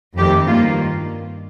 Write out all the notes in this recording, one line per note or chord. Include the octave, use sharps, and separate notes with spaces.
F2 D#3 A3 C4 G4
G2 D#3 A#3 F4